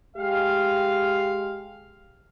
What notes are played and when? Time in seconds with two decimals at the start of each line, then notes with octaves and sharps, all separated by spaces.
0.17 G#3 G4 F5